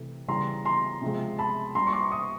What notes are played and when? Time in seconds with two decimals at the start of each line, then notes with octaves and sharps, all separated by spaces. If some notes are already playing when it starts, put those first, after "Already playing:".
Already playing: C3 E3 A3
0.28 C#3 E3 G3 A#5 C6
0.65 A#5 C6
1.02 C3 F3 G#3
1.38 A5 B5
1.75 A#2 G3 A#5 C6
1.87 C#6
1.93 C6 D6
2.11 C#6 D#6